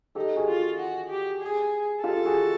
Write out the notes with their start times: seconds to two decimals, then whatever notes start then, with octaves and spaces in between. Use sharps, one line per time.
0.15 D#4 G4 A4
0.36 F#4 G#4
0.47 F4
0.79 F#4
1.10 G4
1.42 G#4
2.04 F4 G4 A4
2.25 F#4 G#4